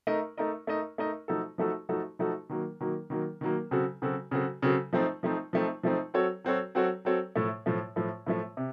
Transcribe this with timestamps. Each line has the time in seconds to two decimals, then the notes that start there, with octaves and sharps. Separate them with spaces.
0.07 A3 D#4 A#4 D#5
0.37 A3 D#4 A#4 D#5
0.67 A3 D#4 A#4 D#5
0.98 A3 D#4 A#4 D#5
1.28 F3 A3 D#4 F#4 A4
1.58 F3 A3 D#4 F#4 A4
1.89 F3 A3 D#4 F#4 A4
2.19 F3 A3 D#4 F#4 A4
2.49 D#3 F#3 A#3
2.80 D#3 F#3 A#3
3.10 D#3 F#3 A#3
3.41 D#3 F#3 A#3
3.71 C#3 F#3 C4 F#4 A4
4.02 C#3 F#3 C4 F#4 A4
4.31 C#3 F#3 C4 F#4 A4
4.62 C#3 F#3 C4 F#4 A4
4.93 F3 A3 C4 D#4
5.23 F3 A3 C4 D#4
5.53 F3 A3 C4 D#4
5.83 F3 A3 C4 D#4
6.14 F#3 C4 F#4 A4 C#5
6.44 F#3 C4 F#4 A4 C#5
6.75 F#3 C4 F#4 A4 C#5
7.05 F#3 C4 F#4 A4 C#5
7.35 A2 F3 A3
7.66 A2 F3 A3
7.96 A2 F3 A3
8.26 A2 F3 A3
8.57 C3